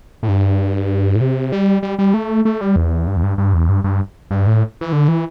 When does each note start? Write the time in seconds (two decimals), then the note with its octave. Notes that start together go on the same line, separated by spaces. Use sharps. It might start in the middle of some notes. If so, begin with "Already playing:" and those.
0.23 A2
0.28 G2
1.16 A2
1.21 C3
1.52 G3
1.83 G3
1.99 G3
2.14 A3
2.45 A3
2.61 G3
2.76 E2
3.07 G2
3.16 E2
3.23 G2
3.38 G2
3.54 E2
3.69 G2
3.84 G2
4.31 G2
4.47 A2
4.81 E3
4.93 D3
5.08 E3